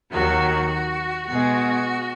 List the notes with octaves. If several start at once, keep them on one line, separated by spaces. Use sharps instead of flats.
D#2 D#3 F#3 F#4
F#4
B2 G#3 F#4